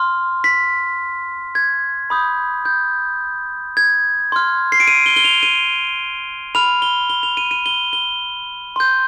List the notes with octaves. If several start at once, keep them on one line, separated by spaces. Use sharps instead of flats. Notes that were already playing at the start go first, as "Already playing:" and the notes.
Already playing: C6 F6
B6
G#6
B5 D#6 G6
G6
G#6
C6 F6
C7
D7
D#7
G7
G7
F7
D#7
B5 F6 F7
G7
G7
F7
D#7
D#7
G7
G7
C6 G6